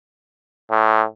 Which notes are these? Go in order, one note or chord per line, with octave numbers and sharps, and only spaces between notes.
A2